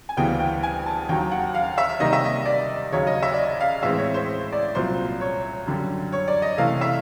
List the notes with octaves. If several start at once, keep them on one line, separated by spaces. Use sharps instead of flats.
G#5
D2 C#3 E3 G3 B3 G5
G5
G#5
A5
D#2 D#3 F#3 G5
F#5
F5
E5
C3 D#3 G3 A#3 D#5
E5
D#5
D5
D#2 C#3 F#3 C#5
D#5
E5
D5
D#5
F5
A2 E3 G#3 C4 E5
C#5
C5
D5
C2 A#2 F#3 C5
C#5
F#2 D3 G3
C#5
D5
D#5
C3 E3 A3 F5
E5